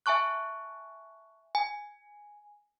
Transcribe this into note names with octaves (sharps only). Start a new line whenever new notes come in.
E5 G#5 A5 C#6 F#6
G#5